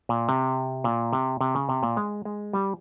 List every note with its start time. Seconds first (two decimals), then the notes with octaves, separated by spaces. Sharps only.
0.09 A#2
0.29 C3
0.84 A#2
1.13 C3
1.41 C3
1.55 C#3
1.69 C3
1.83 A#2
1.97 G#3
2.25 G#3
2.53 G3